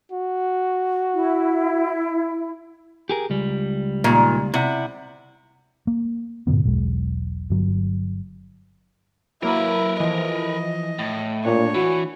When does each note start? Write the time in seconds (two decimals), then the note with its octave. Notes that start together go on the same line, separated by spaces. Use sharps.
0.12 F#4
1.13 E4
3.09 G4 G#4 A#4
3.30 C#2 G3
4.04 A#2 D#3
4.54 C3 E4 D5 F#5
5.87 A#3
6.47 G2 A#2 D3 B3
6.64 E1 B1 G#3
7.50 G1 F#3
9.43 F#3 A#3 E4 A#4 B4
10.00 E3 F3 D#5
10.99 A2
11.45 A#2 D4 C#5
11.74 E3 F#4